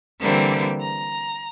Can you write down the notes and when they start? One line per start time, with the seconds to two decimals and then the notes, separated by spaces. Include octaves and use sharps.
0.21 D3 E3 G3 A#3 C4
0.79 A#5